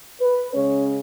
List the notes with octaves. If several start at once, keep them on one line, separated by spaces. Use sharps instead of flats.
B4
C#3 G#3 C#4 C#5